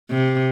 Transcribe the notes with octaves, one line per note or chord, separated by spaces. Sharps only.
C3